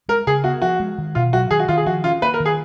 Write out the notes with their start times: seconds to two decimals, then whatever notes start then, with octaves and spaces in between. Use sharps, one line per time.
0.08 G#3 A#4
0.27 C#3 G#4
0.44 B3 F#4
0.62 F3 F#4
0.80 G#3
0.98 D#3
1.15 B2 F4
1.33 F#3 F#4
1.51 D#3 G#4
1.60 F#4
1.68 D#3 F4
1.77 G#4
1.86 F3 F#4
2.04 C#4 F4
2.22 A#3 B4
2.34 A#4
2.40 D#3
2.46 G#4